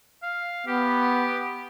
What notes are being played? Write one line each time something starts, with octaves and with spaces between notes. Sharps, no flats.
F5
B3 G4